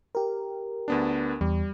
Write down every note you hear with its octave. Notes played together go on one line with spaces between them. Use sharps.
G4 A#4
D2 B3 D4
E2 G3